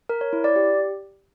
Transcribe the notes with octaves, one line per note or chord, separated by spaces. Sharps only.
A#4
C#5
E4
D5
G4